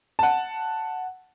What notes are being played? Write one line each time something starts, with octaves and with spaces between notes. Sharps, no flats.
F#5 A5